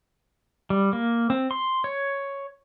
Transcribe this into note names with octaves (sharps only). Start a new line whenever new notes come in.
G3
A#3
C4
C6
C#5